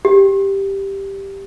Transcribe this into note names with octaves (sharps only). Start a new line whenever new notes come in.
G4